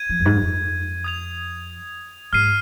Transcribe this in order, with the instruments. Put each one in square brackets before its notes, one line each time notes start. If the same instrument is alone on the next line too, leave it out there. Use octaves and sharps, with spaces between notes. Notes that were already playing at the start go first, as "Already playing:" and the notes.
Already playing: [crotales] G#6 D#7
[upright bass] F3
F2
G#2
F2
[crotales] D#6 G#6 F7
[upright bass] G#2 [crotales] F6 C7 D#7